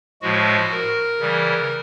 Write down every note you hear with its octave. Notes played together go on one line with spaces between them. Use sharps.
A2 F3 G#3 F#4
A#4
C#3 E3 G3